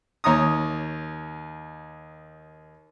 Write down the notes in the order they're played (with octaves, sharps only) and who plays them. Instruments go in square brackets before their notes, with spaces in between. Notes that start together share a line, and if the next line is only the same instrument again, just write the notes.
[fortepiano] D#2 C#5 A#5 D#6